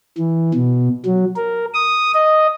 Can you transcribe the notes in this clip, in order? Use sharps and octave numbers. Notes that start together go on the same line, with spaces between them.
E3
B2
F#3
A#4
D#6
D#5